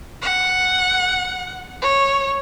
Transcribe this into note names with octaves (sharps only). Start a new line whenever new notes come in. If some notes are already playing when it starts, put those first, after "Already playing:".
F#5
C#5